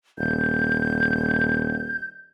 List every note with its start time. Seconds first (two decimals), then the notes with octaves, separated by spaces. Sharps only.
0.18 D#1 G6